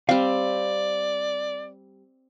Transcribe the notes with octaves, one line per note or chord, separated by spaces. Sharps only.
G3 C4 D5 F5